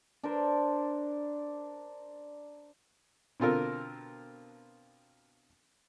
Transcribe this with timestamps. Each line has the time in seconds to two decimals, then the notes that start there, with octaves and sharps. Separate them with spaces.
0.23 D4 A#4 C5 D5
3.40 B2 D3 C4 F4 A4 A#4